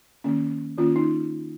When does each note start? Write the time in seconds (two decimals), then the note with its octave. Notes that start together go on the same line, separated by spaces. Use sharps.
0.24 D#3 A#3 C#4
0.77 D#3 A#3 C#4 F4
0.96 D#4